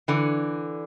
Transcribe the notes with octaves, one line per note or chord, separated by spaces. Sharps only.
D3 E3